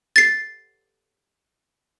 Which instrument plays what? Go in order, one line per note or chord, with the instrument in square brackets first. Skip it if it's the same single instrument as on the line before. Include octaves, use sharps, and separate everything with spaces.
[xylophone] A6 C7